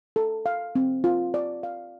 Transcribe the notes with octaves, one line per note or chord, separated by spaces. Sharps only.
A4
F5
C4
F4
D5
F5